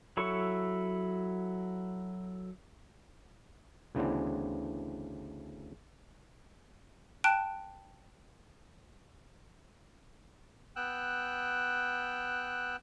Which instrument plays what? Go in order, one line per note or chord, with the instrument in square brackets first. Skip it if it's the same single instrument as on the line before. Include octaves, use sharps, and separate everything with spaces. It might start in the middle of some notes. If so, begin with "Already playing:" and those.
[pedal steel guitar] F#3 E4 A4 C#6
[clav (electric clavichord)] D2 C#3 E3 B3 C4 D4
[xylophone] G5 A5 F#6 D7
[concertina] B3 G5 E6 F#6